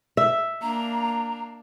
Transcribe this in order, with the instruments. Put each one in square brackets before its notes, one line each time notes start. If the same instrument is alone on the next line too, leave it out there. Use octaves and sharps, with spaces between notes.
[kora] E5
[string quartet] A#3 D4 [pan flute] A#5